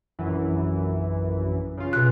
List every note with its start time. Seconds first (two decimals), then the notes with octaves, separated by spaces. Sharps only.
0.19 A#1 F#2 E3
1.77 C#3 F4
1.93 B2 F#6